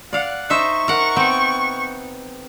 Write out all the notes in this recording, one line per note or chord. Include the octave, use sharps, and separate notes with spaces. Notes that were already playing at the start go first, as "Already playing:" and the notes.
D5 F5 F#5
D#4 C5 E5 C#6
A#4 F#5
B3 C4 G5